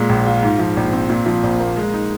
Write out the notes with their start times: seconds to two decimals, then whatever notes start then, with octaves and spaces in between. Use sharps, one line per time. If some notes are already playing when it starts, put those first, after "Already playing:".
Already playing: A#2 G#3
0.09 A#1
0.26 F4
0.43 G#2
0.59 F3
0.77 A#1
0.93 C4
1.09 A#2
1.26 F3
1.43 A#1
1.60 A#3
1.77 G#3
1.94 D#4